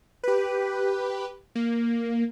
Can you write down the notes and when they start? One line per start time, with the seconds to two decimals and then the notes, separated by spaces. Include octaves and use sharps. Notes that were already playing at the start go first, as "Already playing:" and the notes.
0.23 G4 B4
1.55 A#3